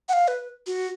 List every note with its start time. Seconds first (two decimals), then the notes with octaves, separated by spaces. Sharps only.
0.09 F#5
0.13 F5
0.28 B4
0.67 F#4